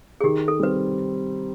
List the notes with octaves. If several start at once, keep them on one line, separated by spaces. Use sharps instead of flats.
G#4
D#3 G4
A4
G3 C4 B4